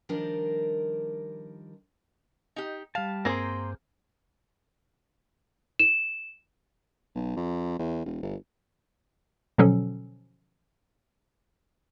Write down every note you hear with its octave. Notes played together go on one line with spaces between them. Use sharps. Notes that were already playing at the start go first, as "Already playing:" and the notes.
D#3 F3 G3 D4 A#4 D#5
D#4 G4
G3 F5 A5
G2 A#3 C4 G#4 A#5 C6
E7
B1
F2
E2
E1
G1
B2 D3 F3 F#3 C#4 A4